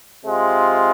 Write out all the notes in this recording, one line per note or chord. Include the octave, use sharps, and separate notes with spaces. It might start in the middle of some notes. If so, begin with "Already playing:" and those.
C3 G#3 F4